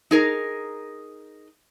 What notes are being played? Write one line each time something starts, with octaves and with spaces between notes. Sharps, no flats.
D#4 G#4 A#4